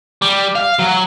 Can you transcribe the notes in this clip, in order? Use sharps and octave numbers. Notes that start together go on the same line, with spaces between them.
G3
F5
F#3